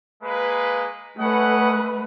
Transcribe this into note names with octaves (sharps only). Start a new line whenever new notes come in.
G#3 A#3 B4
A3 C#4 B4 D#5 F#5